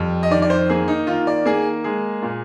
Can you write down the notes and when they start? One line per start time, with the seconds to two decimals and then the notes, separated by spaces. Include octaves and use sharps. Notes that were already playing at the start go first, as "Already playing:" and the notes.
Already playing: F2 G3
0.23 D#5
0.31 D#3 D5
0.42 D5
0.50 C5
0.70 A#3 G#4
0.88 D#4
1.07 D#3 F4
1.27 D5
1.45 A#3 G#4
1.84 G#3 G#4
2.22 A#2